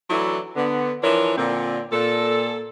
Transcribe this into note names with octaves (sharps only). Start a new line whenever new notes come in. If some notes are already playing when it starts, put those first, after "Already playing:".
E3 F#3 A3 D4 E4
D3 B3
E3 F3 D4 E4 A#4 C#5
A#2 D3 C4
A#2 A4